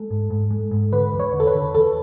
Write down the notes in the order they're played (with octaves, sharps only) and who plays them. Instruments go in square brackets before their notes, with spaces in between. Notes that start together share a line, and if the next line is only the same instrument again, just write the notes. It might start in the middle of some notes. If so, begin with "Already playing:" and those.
Already playing: [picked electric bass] G#3 [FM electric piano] A4
[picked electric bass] G#2
G#2
G#3
G#2
[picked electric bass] D3 [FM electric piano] B4
[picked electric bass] E2
[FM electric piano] C#5
[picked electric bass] D3
[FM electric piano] A4
B4
[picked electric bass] D3
[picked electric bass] E2 [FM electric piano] A4